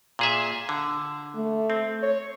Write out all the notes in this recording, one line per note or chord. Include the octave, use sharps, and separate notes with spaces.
A#2 G#4 E5
D3
A3
C4
C#5